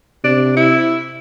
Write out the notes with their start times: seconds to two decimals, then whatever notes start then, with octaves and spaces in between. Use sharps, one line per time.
0.24 C3 D4
0.56 E4